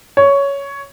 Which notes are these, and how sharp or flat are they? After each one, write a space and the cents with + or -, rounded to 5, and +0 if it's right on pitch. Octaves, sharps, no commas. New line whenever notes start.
C#5 +10